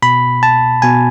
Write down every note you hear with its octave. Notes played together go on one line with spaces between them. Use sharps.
B2 B5
A5
B2 G#5